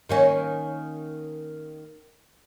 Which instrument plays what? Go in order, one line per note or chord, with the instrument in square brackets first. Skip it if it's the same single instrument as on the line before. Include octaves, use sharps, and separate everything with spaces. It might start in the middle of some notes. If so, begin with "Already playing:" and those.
[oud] D#3 A#3 C#4